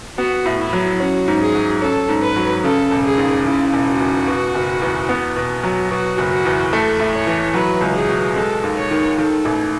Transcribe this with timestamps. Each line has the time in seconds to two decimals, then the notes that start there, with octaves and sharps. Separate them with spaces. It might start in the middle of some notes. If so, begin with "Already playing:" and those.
0.18 B3 F#4
0.45 A2
0.60 E4
0.73 F#3
1.00 C#4 F#4
1.28 G#2
1.42 G#4
1.55 F#3
1.82 C#4 A4
2.09 G#2
2.22 B4
2.36 F#3
2.63 C#3 A4
2.91 E1
3.05 G#4
3.18 D#2
3.45 C#3 E4
3.73 E1
3.87 F#4
4.00 E2
4.27 B2
4.55 F#1
4.82 E2
5.09 B3
5.36 B2
5.63 F#3
5.91 B2 F#4
6.18 F#1
6.31 F#4
6.45 E2
6.72 A3 A4
6.99 A2
7.13 C#5
7.27 E3
7.54 F#3 B4
7.81 C#2
7.95 G#4
8.09 B2
8.36 G#3 A4
8.64 D#2
8.77 C#5
8.91 D#3
9.18 D#3 A4
9.45 A1